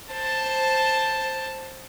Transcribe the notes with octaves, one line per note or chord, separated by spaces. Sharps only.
C5 A5